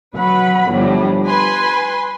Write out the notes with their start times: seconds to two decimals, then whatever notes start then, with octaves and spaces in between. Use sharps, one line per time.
0.15 F#3 B4 F#5 B5
0.70 G1 A2 F3 G3
1.26 B4 G#5 B5 C6